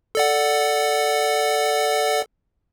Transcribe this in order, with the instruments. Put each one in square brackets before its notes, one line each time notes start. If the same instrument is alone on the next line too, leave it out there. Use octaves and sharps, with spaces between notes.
[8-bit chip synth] A4 D5 F#5